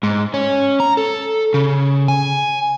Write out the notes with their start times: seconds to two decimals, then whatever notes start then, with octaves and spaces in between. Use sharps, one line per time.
0.03 G#2
0.34 C#4
0.80 A#5
0.97 A4
1.54 C#3
2.08 G#5